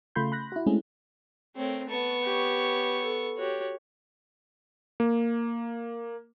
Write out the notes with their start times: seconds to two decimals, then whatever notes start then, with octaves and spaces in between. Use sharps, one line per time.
0.15 C#3 A3 F4 B5 C6 G6
0.32 B5 F#6 A#6
0.52 E4 F#4
0.66 G#3 A3 C4 C#4 E4 G#4
1.56 A3 C4 A#4 C#5
1.89 B3 A5 C#6
2.24 G4 C#5
3.03 A4
3.38 F#4 G4 C#5
5.00 A#3